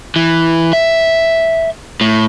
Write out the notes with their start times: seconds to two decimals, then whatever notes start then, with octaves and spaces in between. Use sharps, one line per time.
0.16 E3
0.73 E5
2.01 A2